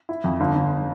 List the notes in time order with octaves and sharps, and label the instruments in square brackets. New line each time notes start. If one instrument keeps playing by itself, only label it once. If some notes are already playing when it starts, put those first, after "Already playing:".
[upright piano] E4
F2
G1
G1